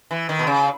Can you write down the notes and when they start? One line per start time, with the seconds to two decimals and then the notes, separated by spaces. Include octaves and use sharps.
0.11 E3
0.29 D#3
0.39 B2
0.47 C#3